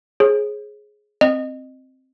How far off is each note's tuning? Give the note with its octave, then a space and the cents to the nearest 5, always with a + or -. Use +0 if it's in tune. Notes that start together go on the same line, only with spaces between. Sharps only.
G#4 +10 C#5 -45
C4 +0 D#5 -15